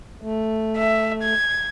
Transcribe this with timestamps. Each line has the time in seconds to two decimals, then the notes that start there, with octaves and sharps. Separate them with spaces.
0.22 A3
0.77 E5
1.23 G#6